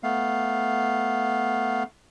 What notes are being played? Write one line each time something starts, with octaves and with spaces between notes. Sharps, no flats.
A3 B3 F5